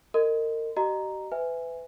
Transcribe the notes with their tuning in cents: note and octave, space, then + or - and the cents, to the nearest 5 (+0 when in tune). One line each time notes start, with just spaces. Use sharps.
A#4 -35 D#5 -10 C6 -30
G4 -40 D#5 -30 A#5 +0
B4 +30 E5 +0 G#5 -5